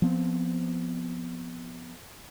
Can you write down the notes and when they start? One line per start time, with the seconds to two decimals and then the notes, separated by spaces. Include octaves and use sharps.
0.02 F3 B3 C4